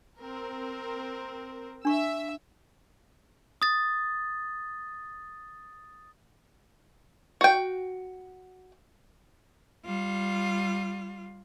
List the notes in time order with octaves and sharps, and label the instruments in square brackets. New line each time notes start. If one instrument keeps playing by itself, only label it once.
[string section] C4 A#4
[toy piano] D4 C#6 [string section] E5 E6
[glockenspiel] D#6 A6
[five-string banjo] F#4 G5
[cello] G3 F4